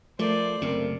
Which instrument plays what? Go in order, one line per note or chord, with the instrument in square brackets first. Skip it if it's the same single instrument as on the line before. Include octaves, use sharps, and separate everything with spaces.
[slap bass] F3 [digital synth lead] A3 [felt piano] A#4 [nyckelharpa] C5 D5
[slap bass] F#1 C3 [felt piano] C4 A#4